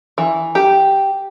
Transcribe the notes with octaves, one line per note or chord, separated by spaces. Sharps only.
E3
G4